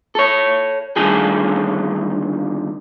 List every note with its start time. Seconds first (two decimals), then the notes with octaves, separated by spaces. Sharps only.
0.15 A4 C#5
0.96 D2 G2 D3 D#3 G#4 A4